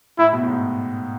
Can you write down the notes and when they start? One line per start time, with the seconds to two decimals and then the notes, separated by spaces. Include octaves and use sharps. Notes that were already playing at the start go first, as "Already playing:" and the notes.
0.18 A2 E4
0.33 B2
0.43 A2
0.48 G#2